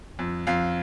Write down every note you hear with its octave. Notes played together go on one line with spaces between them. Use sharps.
F2
F2 F5